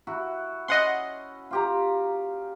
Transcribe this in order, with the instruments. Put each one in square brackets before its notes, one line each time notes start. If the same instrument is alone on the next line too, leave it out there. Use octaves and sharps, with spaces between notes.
[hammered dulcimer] E4 F#4
[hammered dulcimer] C#4 [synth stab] D#5 F#5 C6
[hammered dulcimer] F4 G4 A#5